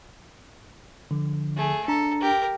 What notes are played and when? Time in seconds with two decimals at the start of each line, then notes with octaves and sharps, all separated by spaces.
1.11 D3 F3
1.56 A3 G#4
1.88 D4 A4 A#5
2.21 G4 A#4